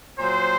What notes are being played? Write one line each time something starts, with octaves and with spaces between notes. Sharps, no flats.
A#2 F#3 C5